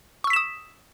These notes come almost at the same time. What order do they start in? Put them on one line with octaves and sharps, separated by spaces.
C#6 E6 B6 E7 D#6